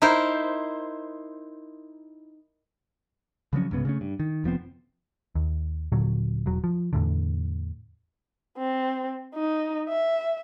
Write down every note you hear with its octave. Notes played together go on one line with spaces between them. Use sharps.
D#4 E4 A#4 C5
C#3 F3 F#3 C#4
C2 G#2 C#3 B3
C#3 A3 C#4
G2
D#3
F1 F3 B3 C4
D#2
D#1 A#2 D3 F#3
E1 F#3
F3
E2 A2 D3
C4
D#4
E5